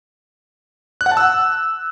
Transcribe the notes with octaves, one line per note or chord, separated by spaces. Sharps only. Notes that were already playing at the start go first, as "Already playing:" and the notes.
F#6
F#5
A5
E6